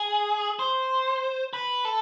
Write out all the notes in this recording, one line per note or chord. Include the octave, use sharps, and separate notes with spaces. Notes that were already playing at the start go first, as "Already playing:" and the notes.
Already playing: G#4
C5
B4
A4